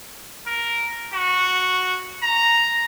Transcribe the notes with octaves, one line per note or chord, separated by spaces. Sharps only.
A#4
F#4
A#5